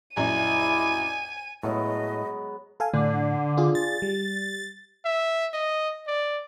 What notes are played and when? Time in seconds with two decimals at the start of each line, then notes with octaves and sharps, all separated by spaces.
0.17 A#1 F#2 E4 D5 D#5 G#5 D#7
1.63 A2 F#3 G#3 B3 D#5
2.80 A4 F5 G#5
2.93 A2 D3 D4
3.57 D4 F4 G#4
3.75 A6
4.02 G3
5.05 E5
5.53 D#5
6.07 D5